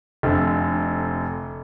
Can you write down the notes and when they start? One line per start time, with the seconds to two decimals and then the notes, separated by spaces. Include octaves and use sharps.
0.23 F1 F2 D3